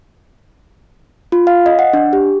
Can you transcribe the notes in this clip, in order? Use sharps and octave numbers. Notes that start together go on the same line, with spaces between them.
F4
F5
D#5
F#5
D4
G4